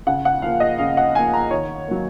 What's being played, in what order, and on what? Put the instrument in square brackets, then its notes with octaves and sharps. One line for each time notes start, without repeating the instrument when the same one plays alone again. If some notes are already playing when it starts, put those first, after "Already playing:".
[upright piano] C#3 F#5
F#5
F3 A#3 F5
D#5
C#3 F5
F#5
F3 A#3 G#5
A#5
D#3 C#5
F#3 A#3